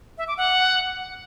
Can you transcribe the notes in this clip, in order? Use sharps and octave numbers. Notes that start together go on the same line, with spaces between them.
E5
D6
F#5